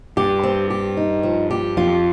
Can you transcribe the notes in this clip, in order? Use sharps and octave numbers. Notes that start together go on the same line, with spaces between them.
G2 G4
C4
G4
D#4
F3
G4
F2 F4